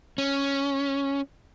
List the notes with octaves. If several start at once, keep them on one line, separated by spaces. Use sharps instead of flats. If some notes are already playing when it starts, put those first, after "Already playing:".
C#4